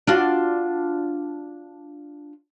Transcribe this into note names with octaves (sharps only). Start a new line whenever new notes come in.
D4 F4 F#4